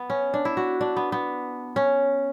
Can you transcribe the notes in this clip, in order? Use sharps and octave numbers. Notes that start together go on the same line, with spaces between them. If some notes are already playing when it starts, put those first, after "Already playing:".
Already playing: B3
C#4
D4
E4
F#4
D4
B3
B3
C#4